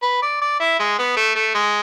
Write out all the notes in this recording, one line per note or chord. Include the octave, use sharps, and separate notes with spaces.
B4
D5
D5
E4
G#3
B3
A3
A3
G#3